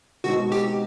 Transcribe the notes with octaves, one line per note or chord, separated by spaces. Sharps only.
B2 G#3 C4 D#4 F#4
G4